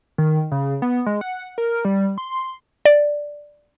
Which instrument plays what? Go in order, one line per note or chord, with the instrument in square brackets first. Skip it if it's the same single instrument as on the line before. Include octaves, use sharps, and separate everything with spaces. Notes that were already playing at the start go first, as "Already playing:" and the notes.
[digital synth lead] D#3
C#3
B3
G#3
F#5
A#4
G3
C6
[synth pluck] D5